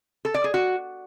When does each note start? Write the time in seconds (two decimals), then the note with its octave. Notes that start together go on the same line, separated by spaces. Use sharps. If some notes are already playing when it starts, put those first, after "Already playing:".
0.25 A4
0.34 D5
0.44 G#4
0.54 F#4